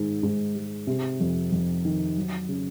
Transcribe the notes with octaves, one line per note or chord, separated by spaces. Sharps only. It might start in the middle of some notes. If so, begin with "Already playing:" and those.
Already playing: G#2 D#3
G#2
G#3
C3
F2
F2
D#3
F#3
C#3